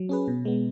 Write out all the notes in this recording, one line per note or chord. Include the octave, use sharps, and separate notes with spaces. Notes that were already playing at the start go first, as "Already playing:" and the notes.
Already playing: F#3
C#4 G#4 B4
B2
G#3 B3